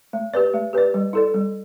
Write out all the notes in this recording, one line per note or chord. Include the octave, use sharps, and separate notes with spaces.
A3
G4 B4 D5
A3
G4 B4 D5
G3
E4 A4 D5
G3